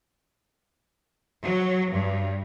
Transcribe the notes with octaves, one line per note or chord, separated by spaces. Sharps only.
F#3
G2